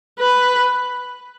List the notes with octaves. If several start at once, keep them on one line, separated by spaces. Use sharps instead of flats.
B4